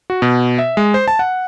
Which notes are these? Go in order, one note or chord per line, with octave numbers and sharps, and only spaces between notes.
F#4
B2
E5
G#3
C5
A5
F#5